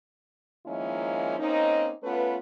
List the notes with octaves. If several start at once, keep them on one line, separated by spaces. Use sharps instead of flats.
D#3 F3 G#3 A#3 C#4 E4
A#3 C4 C#4 D#4
A3 B3 C#4 F4 B4